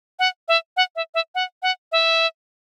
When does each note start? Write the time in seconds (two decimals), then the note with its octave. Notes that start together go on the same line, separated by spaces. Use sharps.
0.19 F#5
0.48 E5
0.77 F#5
0.96 E5
1.15 E5
1.35 F#5
1.63 F#5
1.92 E5